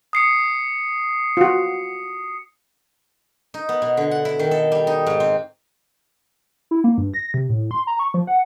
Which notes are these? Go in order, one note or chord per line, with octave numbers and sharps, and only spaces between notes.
D#6 C7 C#7
F4 F#4
D#4
B3
B2
D3
F#5
E4
D#3
A4
G3
D#4
G#2
C4
E4
A#3
G2
A#6
C3
A2
C6
A#5
C#6
F3
F#5